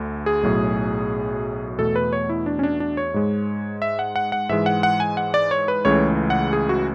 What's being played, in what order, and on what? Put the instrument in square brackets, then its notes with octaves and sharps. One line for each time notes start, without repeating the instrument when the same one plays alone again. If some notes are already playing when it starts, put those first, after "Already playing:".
Already playing: [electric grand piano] D2 D3 A3
G#4
B1 A2 F#3
E2 B2 A3 A4
B4
C#5
E4
D4
C#4
D4
D4
C#5
G#2 G#3
E5
F#5
F#5
F#5
G#2 E3 G#3 E5
F#5
F#5
G#5
F#5
D5
C#5
B4
C#2 C#3 E3 A3 C#5
F#5
G#4
F#4